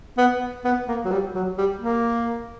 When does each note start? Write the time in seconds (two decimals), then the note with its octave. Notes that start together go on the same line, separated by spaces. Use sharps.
0.18 B3
0.65 B3
0.88 A#3
1.05 F#3
1.11 G3
1.35 F#3
1.58 G3
1.81 A#3